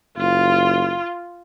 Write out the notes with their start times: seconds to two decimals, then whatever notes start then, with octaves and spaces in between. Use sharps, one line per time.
0.17 F#1 F4